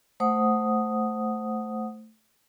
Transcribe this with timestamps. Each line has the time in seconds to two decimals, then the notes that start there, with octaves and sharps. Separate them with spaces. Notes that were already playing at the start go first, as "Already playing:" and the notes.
0.20 A3 C5 F#5 D#6